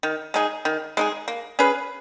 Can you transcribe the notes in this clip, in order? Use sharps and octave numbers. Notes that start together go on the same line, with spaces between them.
D#3
G#3 D#4 G#4
D#3
G#3 D#4 G#4
A#3
C#4 G#4 B4